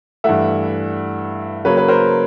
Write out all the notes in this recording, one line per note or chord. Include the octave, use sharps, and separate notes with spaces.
G2 E3 A3 E5 F#5
C#3 F#3 A#3 B4 C#5
B4
A#4 C5